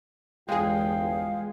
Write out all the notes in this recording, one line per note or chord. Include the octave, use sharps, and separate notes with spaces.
G1 E2 G#3 F4 G#4 F5 G5